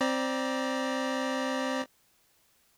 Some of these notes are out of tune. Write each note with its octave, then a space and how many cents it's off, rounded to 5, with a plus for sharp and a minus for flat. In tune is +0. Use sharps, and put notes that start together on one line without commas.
C4 +0 D5 +0 A#5 +30